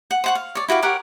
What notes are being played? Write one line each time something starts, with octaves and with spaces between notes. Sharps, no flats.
F#5
C5 F#5 C#6
F5
C#5 D5
E4 F#4 G4 F5
G4 A#4 C#5 F#5